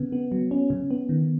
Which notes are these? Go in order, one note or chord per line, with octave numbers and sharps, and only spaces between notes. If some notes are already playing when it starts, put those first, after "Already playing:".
Already playing: C#3 B3
B3
F#3
C#4
C#3
B3
D#3